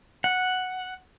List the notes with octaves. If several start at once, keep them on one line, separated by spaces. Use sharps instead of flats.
F#5